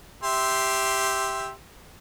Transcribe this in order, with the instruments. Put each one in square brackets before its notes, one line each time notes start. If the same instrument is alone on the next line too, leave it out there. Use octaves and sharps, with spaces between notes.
[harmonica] G4 E5 C6